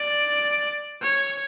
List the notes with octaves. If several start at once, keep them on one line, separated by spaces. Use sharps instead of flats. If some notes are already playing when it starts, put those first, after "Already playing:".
Already playing: D5
C#5